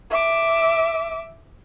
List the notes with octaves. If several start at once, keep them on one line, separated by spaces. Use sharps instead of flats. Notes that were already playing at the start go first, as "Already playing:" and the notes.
E5 D6